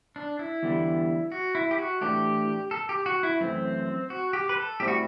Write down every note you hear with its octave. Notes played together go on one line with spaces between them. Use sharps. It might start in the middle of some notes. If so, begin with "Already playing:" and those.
D4
E4
E2 D3 G3 B3
F#4
E4
G4
F#4
A2 E3 A3 D4 G4
A4
G4
F#4
E4
F#2 E3 A3 C4
F#4
G4
B4
A4
A2 G3 C4 E4 G4
F#4